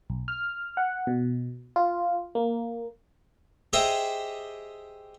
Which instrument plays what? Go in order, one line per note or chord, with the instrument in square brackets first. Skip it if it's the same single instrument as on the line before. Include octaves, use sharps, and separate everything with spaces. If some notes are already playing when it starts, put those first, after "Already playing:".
[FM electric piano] B1
F6
F#5
B2
F4
A#3
[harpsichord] G4 G#4 C5 D#5 E5 G5